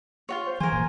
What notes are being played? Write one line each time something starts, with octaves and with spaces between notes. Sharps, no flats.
F4 F#4 C#5
C5
E3 F3 A#4 C5 G#5
F#1 A#2